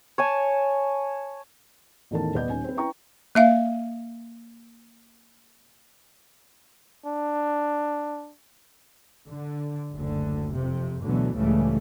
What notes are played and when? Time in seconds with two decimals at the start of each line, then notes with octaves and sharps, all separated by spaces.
0.18 C#5 G#5 A5
2.11 A1 E2 D#3 A4 A#4 A5
2.34 D#1 B3 B4 D5 D#5 G6
2.49 D#1 C#4 D#4 G#5
2.64 C4 B4
2.77 C#4 E4 B4 G5 A#5 C#6
3.35 A#3 E5 F5
7.05 D4
9.28 D3
9.94 F#1 D2 D3
10.52 F2 C3
11.02 D2 B2 D3 E3 F#3 B3
11.35 C#2 A2 C#3 E3 G3 A3